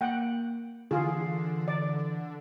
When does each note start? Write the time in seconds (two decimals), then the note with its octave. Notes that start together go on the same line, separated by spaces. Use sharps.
0.01 A#3 F#5 G5
0.91 D3 E3 F4 G#4
1.68 D5